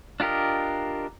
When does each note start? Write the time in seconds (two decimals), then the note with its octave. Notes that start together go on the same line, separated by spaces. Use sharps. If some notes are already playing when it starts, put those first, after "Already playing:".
0.20 D4 F4 G4 A#4 D#5